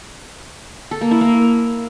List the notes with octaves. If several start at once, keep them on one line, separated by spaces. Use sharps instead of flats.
A4
A#3
E4
A#3